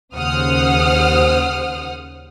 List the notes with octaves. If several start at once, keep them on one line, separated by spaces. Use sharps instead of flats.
D#2 C#3 C5 F#5 D#6 F6